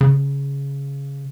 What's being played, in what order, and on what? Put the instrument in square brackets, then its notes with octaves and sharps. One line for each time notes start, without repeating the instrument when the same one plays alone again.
[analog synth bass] C#3